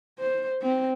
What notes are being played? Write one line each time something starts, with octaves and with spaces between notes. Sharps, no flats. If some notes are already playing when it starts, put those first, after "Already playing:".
C5
C4